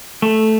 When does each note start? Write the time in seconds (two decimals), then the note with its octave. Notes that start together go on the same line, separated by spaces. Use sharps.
0.22 A3